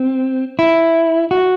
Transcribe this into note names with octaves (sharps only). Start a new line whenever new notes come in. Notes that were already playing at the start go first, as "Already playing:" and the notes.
Already playing: C4
E4
F#4